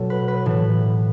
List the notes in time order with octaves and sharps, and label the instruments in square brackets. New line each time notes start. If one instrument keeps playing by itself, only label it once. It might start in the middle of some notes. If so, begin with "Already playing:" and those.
Already playing: [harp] B2 F#3 A4
B4
B4
A2 E3